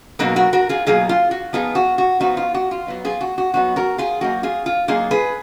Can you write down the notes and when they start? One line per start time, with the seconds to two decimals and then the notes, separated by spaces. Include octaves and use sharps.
0.19 B2 F#3 A#3 D#4 F#4 A#4
0.36 F#4 A#4
0.53 F#4 A#4
0.69 F4 G#4
0.87 B2 F#3 A#3 D#4 F4 G#4
1.09 F4
1.31 F#4
1.53 F3 B3 D#4 F4 G#4
1.75 F#4
1.98 F#4
2.20 F3 B3 D#4 F#4
2.37 F4
2.54 F#4
2.71 F4
2.87 F#3 B3 D#4
3.05 F4 G#4
3.21 F#4
3.38 F#4
3.54 F#3 B3 D#4 F#4
3.76 F#4 A#4
3.98 F4 G#4
4.21 F#3 A#3 D#4 F#4
4.43 F4 G#4
4.66 F4
4.88 F#3 A#3 D#4 F4 G#4
5.11 G#4 B4